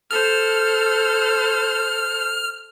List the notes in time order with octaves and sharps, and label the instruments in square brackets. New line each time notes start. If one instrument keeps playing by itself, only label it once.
[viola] A4 C5 [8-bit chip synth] F6